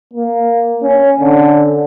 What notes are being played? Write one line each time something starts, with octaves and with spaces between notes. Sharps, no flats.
A#3
C#4
D3